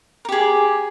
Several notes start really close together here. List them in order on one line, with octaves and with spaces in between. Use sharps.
A#4 G4 G#4